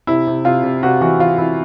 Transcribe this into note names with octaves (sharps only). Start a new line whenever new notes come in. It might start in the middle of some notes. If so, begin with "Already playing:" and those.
C3 E4
C3
C3 F4
C3
C3 F#4
E3 F#4
E3 F4
E3 E4